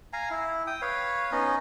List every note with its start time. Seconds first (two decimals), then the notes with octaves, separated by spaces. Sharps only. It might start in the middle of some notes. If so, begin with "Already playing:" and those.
0.13 F5 G#5 A#5
0.31 E4
0.67 G5 D#6
0.82 B4 C#5 F5
1.32 B3 C#4 D#4 D#5